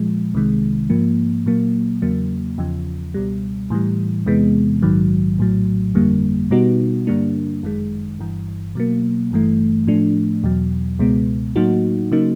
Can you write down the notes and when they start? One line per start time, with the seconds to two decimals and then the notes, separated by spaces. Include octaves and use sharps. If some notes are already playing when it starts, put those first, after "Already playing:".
Already playing: A#2 F3 G#3
0.34 C2 C3 D#3 G#3
0.90 G#2 F3 A#3
1.46 A#2 F#3 A#3
2.02 E2 C#3 F#3 A#3
2.58 E2 C#3 F3
3.14 C#2 B2 G3
3.70 A2 E3 G3
4.26 E2 C3 E3 G#3 B3
4.82 A#1 G#2 D#3 F#3
5.38 A#1 A2 F#3
5.95 G1 F2 D3 G3 A#3
6.51 B2 G3 B3 D#4 F#4
7.07 G2 D3 G3 A#3 D4
7.62 G1 F#2 D#3 G#3
8.19 G1 G2 E3
8.75 B2 F#3 A#3
9.31 G1 G2 E3 A3
9.87 A2 F3 A3 D4
10.43 E2 B2 F#3
10.99 C#2 B2 G#3 B3
11.56 A2 F#3 A#3 D#4 F#4
12.12 C#3 F#3 A#3 D#4